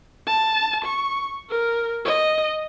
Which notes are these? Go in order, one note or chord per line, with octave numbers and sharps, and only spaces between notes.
A5
C#6
A#4
D#5